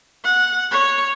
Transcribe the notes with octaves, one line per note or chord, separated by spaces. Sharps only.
F#5
C#5